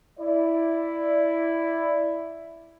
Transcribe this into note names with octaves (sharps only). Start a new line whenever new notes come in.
E4 D5